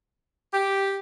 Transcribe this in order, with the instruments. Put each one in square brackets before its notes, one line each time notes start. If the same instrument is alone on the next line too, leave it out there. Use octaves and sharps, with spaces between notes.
[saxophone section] G4